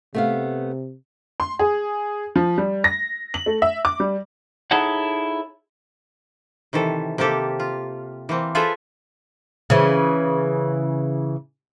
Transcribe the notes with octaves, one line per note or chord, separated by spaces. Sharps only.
C3 A3 B3 F5
C6
G#4
F3
G3
A#6
F#7
A3
E5
D6
G3
D#4 E4 G#4 A4 C#5 F#5
C3 D#3 E3 A4
C3 A#3 G4 A4
F4
E3 A#3 C4
F4 G#4 A4 B4 C5 E5
C#3 E3